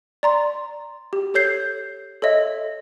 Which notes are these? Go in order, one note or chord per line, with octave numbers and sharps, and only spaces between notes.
D5 A#5 C6
G4
G4 A4 C#5 G6 C7
A4 C#5 D#5 E5